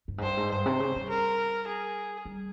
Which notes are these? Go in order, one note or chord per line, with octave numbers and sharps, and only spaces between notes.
G2
G#2
G2 C5
G#2
G2 C5
C3
C#3
G3
A#4
G#4
G3